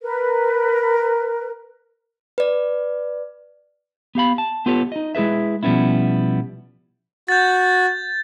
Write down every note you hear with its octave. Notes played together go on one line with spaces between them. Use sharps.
A#4 B4
B4 D5
B3 G4 F5 B5
A5
B3 F4 G4 A4 B4 C#5
D#4 D#5
G#3 E4 G#4 B4 E5
B2 F3 G3 B3 C#4 E4
F#4 G6 A6